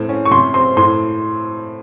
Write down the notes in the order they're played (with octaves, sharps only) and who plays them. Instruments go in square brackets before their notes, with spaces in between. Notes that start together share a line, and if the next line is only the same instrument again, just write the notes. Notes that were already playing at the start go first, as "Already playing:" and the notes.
Already playing: [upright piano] A2 C4
C#4
C#6
C3 C6
C4 C6
A2 C6